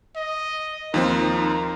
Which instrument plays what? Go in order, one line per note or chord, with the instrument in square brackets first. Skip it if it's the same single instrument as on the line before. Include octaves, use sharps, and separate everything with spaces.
[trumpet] D#5
[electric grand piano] D#2 F3 C4 [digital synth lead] D#4 [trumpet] A#4